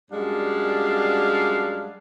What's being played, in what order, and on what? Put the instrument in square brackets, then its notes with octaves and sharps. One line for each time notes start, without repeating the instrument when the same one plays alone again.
[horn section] F#2 G3 G#3 D4 F5